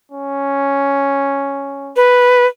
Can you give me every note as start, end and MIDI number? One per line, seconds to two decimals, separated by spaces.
0.12 1.96 61
1.96 2.46 71